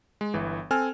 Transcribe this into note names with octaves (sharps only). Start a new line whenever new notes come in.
G#3
G1 E3
C4 A4 G#5 F6